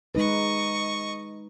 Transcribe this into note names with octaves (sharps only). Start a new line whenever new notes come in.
G#3 D#4 B4 D#5 C#6